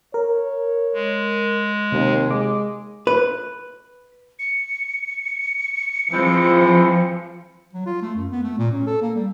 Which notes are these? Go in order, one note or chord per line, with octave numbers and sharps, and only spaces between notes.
A#4 C#5
G#3
D#2 C3
G#3 D6
B4
C#7
E3 F3 G#3 C4
F#3
F4
A3
F#2
B3
A3
A#2
C#4
A4
A#3
G3